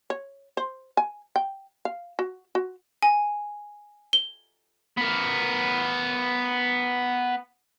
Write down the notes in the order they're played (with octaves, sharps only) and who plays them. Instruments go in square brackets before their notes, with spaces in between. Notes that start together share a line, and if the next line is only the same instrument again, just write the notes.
[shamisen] C#5
C5
G#5
G5
F5
F#4
F#4
[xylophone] G#5
G7
[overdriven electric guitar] B3 A#4